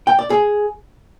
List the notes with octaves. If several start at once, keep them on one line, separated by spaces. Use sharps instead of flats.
G5
D5
G#4